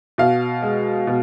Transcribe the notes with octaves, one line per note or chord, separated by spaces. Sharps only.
B2 F5
G#3
B2